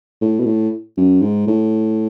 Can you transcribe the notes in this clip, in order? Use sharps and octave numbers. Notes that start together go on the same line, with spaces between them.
A2
B2
A2
F#2
G#2
A2